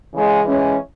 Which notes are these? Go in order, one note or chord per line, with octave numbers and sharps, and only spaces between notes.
C#3 E3 G#3
E3 G#3 C#4